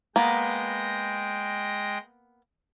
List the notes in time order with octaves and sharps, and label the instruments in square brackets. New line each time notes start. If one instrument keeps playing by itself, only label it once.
[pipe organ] G#3 G5 A#6 [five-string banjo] A#3 B3